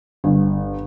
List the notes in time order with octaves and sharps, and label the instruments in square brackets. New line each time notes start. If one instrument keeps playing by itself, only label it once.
[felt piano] G1